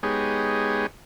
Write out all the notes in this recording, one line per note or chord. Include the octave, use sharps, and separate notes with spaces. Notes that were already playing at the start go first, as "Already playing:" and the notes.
G#3 B3 D#4 G4 G#4 C#5